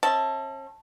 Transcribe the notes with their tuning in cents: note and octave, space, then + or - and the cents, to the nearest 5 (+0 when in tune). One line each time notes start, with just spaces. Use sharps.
C#4 -45 E5 -45 A5 +0